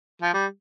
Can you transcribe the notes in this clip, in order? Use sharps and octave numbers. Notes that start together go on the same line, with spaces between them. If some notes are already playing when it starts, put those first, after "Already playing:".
F3
G3